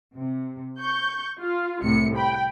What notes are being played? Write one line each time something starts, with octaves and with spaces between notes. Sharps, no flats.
C3
C#6 G6
F4
C2 A2 C3 C#7
G5 B5